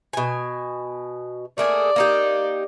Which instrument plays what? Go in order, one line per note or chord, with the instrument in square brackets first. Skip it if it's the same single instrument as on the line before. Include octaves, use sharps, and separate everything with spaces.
[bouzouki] B2 G#5
[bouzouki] A3 A#3 G#4 [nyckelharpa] D5
[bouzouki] A#3 D#4 G4